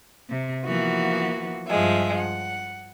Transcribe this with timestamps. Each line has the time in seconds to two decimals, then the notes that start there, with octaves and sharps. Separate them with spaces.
0.28 C3
0.65 E3 F3 A#3 B3 F#4
1.68 G2 F3 G#3 E5
2.18 F#5